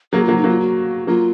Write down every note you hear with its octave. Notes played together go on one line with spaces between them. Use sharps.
F#3 A#3 G#4
F#3 A#3 F4
D#4
F#3 A#3 F4
F#4
F#3 A#3 F4